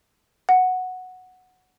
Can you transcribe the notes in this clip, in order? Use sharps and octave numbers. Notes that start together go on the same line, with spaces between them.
F#5